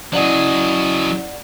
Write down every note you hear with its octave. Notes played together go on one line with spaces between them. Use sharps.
F#3 C#4 E4 G#4 D5 D#5 F#5